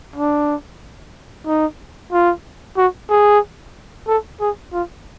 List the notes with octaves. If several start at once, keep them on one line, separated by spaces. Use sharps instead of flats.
D4
D#4
F4
F#4
G#4
A4
G#4
F4